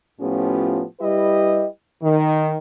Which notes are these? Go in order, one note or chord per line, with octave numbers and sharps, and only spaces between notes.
A2 F3 B3 C#4 F4 G4
G3 E4 G4 B4 D#5
D#3